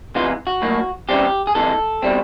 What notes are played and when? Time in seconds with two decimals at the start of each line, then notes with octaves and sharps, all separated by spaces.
0.15 E2 C3 E3 G#3 B3 F4
0.47 F#4
0.62 A2 F#3 A#3
1.09 C#3 E3 G3 C4 G4
1.47 G#4
1.55 C3 E3 G#3 A4
2.02 B2 G3 C4